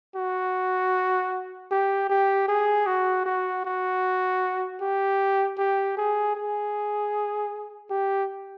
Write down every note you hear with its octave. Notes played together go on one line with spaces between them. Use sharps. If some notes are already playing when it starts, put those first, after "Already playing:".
F#4
G4
G4
G#4
F#4
F#4
F#4
G4
G4
G#4
G#4
G4